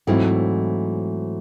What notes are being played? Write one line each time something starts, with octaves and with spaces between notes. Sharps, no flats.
G#2 E3 F#3 A3 C4 E4